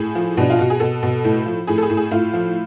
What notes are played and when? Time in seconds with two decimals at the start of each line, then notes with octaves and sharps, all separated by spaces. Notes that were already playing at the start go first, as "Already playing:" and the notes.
Already playing: A2 G#4
0.15 F3
0.37 B2 D4
0.50 F4
0.59 B2 F#4
0.70 G#4
0.80 B2 A4
1.03 B2
1.25 A2
1.46 F3
1.67 A2 G#4
1.78 A4
1.82 G#4
1.90 A2
1.97 G#4
2.11 A2 F4
2.33 F3